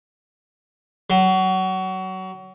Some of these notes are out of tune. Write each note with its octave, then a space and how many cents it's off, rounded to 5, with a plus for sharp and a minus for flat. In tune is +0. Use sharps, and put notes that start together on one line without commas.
F#3 +25